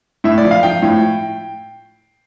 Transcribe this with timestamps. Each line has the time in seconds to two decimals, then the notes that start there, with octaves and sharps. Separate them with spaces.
0.24 A2 E5
0.38 D5
0.45 F3
0.51 F5
0.63 F3 G5
0.82 A2